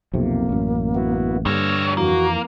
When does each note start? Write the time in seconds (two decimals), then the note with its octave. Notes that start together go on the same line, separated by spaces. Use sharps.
0.14 B1 F2 C3 A#3
0.49 A1 F#2
0.95 B3 E4 F#4
1.46 G2 D3 G3 C#5 E6 F6 A#6
1.97 F2 E3 A#3 F#4